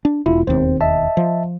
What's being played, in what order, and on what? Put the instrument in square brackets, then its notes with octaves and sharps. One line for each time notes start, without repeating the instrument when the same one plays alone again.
[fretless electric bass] D4
[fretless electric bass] E1 [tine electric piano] E4 F4
[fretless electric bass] E1 D#2 [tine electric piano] C4 C5
[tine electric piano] D#5 E5 A5
[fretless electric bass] F3